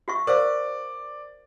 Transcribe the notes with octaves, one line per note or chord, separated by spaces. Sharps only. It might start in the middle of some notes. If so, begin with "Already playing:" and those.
F#4 E5 C#6
A#4 C5 D5 F5